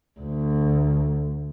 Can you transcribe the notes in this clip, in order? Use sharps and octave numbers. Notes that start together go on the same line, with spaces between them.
D2